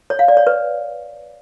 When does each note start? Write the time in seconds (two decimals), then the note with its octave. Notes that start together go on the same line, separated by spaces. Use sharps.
0.10 C#5
0.19 F5
0.28 D5
0.37 C#5
0.47 B4